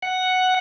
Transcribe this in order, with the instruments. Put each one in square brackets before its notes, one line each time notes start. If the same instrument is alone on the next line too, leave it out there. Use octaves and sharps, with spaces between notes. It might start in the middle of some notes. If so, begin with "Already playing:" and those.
[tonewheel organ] F#5